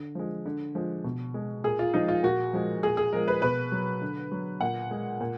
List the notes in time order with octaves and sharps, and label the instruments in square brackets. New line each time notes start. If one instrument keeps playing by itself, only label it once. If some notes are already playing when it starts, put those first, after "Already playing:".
Already playing: [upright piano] D3
F3 G#3
D3
F3 G#3
B2
G#3
A#2 G#4
F4
F3 G#3 D#4
F4
A#2 F#4
F3 G#3
A#2 G#4
G#4
F3 G#3 A#4
B4
B2 B4
F#3
D3
F#3
A#2 F#5
G#3
A#2